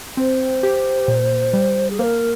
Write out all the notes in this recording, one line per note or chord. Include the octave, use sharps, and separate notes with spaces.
C4 C5
G4
A#2
G3
G#4
A#3 A#4 C5